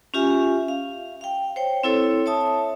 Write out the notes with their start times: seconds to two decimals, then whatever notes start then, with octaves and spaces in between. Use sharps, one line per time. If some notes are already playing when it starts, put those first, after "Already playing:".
0.14 C#4 F4 G4 E5 G#5
0.68 F5
1.21 F5 G5
1.56 C5 C#5 G5
1.83 C4 E4 A4 C#5
2.26 C#5 E5 A5 D#6